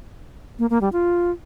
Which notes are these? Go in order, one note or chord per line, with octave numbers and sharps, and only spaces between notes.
A#3
A#3
G3
F4